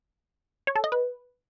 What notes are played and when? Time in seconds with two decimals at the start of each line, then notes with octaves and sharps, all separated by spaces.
0.67 C#5
0.76 A4
0.84 D#5
0.92 B4